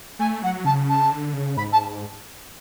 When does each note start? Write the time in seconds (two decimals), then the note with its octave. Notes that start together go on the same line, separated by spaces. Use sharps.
0.19 A3 G#5
0.42 F#3 F#5
0.65 C#3 A5
0.89 A5
1.11 D3
1.33 C#3
1.57 G#2 B5
1.72 A5